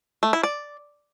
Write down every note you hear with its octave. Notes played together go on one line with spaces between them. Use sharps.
A3
E4
D5